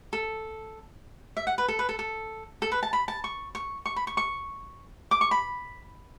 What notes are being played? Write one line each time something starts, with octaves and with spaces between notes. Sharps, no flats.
A4
E5
F#5
B4
A4
B4
A4
A4
A4
B4
A5
B5
A5
C#6
C#6
C#6
B5
C#6
C#6
D6
C#6
B5